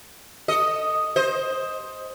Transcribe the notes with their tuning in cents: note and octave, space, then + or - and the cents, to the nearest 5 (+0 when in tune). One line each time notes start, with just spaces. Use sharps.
A4 +20 D#5 +0
C5 +10 D#5 +10